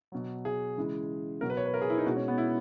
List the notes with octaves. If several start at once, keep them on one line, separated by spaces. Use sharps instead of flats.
B2 F#3
G#4
C#3 E3 G#3
B2 F#3 A#4
B4
C#5
B4
A#4
G#4
E4
D#4
B2 G#3 F#4
C#4
B3
E4